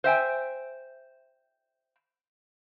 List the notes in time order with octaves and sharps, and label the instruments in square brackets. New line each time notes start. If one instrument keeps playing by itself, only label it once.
[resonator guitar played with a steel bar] C5 E5 G5 G#5